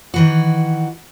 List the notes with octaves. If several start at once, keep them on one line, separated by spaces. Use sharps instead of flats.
D#3 E3 F#4